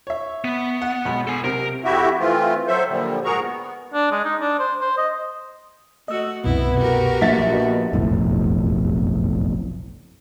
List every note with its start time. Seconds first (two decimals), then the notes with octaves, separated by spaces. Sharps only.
0.07 C#5 E5
0.44 B3
0.82 F#5
1.05 B1 G#3 B5
1.27 A4 G#5
1.44 C3 A#4
1.84 F2 E4 F#4 G4 E5
2.19 E3 A3 C4 F4
2.67 F#3 A4 C5 E5
2.88 A#2 D3 F3 G3
3.25 G#2 F#4 G#4 A#4 A#5 C#6
3.42 B3
3.94 D4
4.12 G#3
4.25 D#4
4.41 D4
4.59 C5
4.81 C5
4.98 D#5
6.08 A3 F#4 D#5 E6
6.44 C2 F#2 B2 B3 C4 E4
6.79 F#4 G4 A#4
7.21 A#1 E5 A6 B6
7.51 B2
7.93 F#1 B1 F2 A2